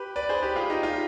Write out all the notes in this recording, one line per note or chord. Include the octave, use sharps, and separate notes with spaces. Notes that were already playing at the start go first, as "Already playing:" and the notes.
Already playing: G4 B4
B4 D5
G#4 C5
G4 B4
F4 G#4
D#4 G4
F4